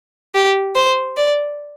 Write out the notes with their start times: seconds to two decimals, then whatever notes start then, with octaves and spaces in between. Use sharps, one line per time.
0.35 G4
0.76 C5
1.17 D5